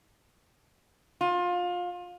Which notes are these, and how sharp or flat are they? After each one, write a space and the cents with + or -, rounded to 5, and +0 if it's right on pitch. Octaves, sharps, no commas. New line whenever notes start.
F4 +25